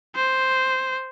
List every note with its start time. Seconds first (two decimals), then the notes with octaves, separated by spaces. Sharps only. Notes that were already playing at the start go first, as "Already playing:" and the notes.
0.15 C5